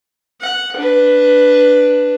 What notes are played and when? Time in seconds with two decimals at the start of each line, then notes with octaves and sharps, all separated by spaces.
0.41 F#5
0.76 D4 B4